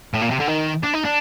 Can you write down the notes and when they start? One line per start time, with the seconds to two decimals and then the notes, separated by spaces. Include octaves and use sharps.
0.14 A2
0.21 A#2
0.30 C3
0.39 D3
0.48 D#3
0.83 D4
0.94 D#4
1.05 D4